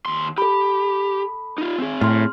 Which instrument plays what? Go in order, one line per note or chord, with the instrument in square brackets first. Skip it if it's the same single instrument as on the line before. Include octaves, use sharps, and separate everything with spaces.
[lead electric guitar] D#2 C6
[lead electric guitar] G4 [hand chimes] A4 B5
[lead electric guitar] D#4 F4
C4 G#4
[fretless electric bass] A2 [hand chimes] C6 F6